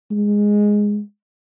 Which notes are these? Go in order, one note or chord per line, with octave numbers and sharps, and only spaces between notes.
G#3